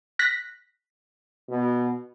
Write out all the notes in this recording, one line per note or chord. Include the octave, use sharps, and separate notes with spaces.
F#6 A#6 B6
B2